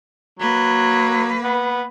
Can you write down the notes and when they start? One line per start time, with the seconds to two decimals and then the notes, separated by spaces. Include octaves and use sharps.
0.39 F#3 A#3 B4
1.43 B3